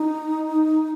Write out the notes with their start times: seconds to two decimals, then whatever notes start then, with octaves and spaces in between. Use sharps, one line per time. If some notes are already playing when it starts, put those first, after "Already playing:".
Already playing: D#4